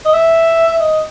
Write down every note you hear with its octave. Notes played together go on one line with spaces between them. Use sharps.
D#5
E5
D#5